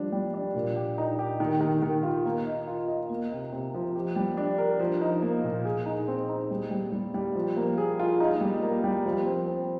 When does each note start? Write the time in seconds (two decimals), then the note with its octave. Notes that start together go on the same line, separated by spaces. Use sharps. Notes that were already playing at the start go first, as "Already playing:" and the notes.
Already playing: F3 G3 D4
0.12 G3
0.34 D4
0.54 A#2
0.76 G4
0.98 D#4
1.19 G4
1.40 D#3
1.61 D#3
1.82 D#3
2.03 F4
2.26 A#3
2.46 D#5
2.68 F4
2.88 D#5
3.09 A#3
3.32 C3
3.53 C3
3.74 F3
3.95 G4
4.16 G3
4.37 D4
4.58 A#4
4.79 F3
5.01 D#4
5.22 A#3
5.43 A#2
5.65 G#4
5.86 D#4
6.08 C4
6.29 D#4
6.51 G3
6.71 G3
6.92 G3
7.14 G3
7.35 F3
7.57 A#3
7.78 G#4
7.99 F4
8.20 D#4
8.41 G3
8.62 A#3
8.84 G3
9.06 F3
9.26 C4
9.47 C4